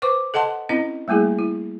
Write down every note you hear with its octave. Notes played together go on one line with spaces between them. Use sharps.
B4 C5 C#6 D6
A4 D#5 F#5 A5 C6
C4 C#4 E4 D#5
G3 A3 A#3 E4 G#4
E4